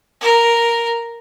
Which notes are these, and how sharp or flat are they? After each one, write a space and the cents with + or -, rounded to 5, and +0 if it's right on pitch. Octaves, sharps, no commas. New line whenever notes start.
A#4 +0